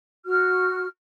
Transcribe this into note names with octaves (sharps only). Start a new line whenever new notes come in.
F#4 F6